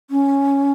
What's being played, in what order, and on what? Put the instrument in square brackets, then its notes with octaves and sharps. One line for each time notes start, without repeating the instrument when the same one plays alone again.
[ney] C#4